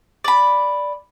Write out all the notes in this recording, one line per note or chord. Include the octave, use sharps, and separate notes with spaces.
D5 B5